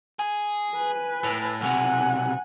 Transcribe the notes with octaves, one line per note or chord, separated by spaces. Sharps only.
G#4
B4 G#5
A2
B1 C3 F#5 G#5